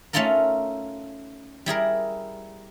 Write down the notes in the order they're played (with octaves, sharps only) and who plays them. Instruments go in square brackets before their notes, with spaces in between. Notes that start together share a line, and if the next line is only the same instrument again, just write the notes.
[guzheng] A3 C#4 D#4 F4 A4 A#4
G3 E4 G#4 A#4